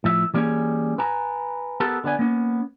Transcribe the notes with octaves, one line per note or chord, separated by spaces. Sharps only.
A2 F3 E5
E3 G3 A#3 C4 C#4 G#4
B4 G#5 A#5
B3 G4 A4 A#4
D3 B3 D5 G#5
A#3 B3 C#4